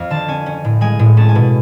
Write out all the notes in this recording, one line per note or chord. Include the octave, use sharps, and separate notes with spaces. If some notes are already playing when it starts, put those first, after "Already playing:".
Already playing: F2 F5
D3 A5
C#4 G#5
C#4
A2
G#3 G#5
A2
C#4 A5
G#5
B2